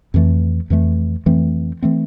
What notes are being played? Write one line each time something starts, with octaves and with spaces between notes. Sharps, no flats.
F2 E3 A3
F2 E3 A3
F2 E3 A3 C4
E3 A3 C4